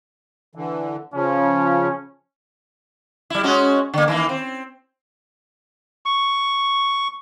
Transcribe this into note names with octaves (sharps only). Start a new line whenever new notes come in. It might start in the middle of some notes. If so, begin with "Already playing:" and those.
D3 E3
C#3 F3 C#4
G3 E4
G#3 C#4 F#4
D3 A#3
D#3 E3 A#3
C4
C#6